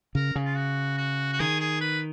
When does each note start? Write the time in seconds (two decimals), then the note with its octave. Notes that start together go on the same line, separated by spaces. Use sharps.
0.15 C#3 A#4
0.36 C#3
0.45 F4
0.56 F#4
0.98 F#4
1.33 F#4
1.39 D#3 G#4
1.60 G#4
1.81 B4